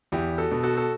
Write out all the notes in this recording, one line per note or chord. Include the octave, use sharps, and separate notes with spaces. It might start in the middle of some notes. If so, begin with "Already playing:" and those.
E2 E4 G4
F#4 A4
B2
F#4 A4
A4